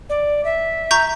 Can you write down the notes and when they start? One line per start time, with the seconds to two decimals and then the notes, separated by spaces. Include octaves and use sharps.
0.09 D5
0.45 E5
0.91 A#5 C#6 G6